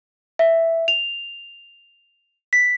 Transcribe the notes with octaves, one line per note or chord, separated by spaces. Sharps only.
E5
F7
B6